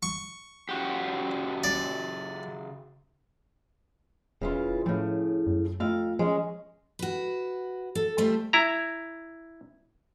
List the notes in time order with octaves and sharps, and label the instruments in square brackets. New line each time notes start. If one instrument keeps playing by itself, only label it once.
[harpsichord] C#6
[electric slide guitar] C#3 F#4 G4
[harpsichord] D5
[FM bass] E1 [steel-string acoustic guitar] C#3 E3 F4
[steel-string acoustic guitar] A2 C#3 [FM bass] F3
[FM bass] F#2
[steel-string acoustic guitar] F2 F5 [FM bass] A3
[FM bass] F3 [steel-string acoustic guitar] G#3 C#4
[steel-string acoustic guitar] F#4 B4
A4
G3 A3 F4 C5 E5
[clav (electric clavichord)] E4 A#5